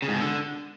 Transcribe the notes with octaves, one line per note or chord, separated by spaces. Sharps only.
C#3
G#2
B2
D3